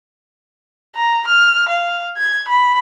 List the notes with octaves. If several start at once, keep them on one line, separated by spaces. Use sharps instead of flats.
A#5
F6
F5
G#6
B5